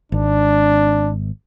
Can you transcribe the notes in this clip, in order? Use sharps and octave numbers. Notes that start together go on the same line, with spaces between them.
G#1 D4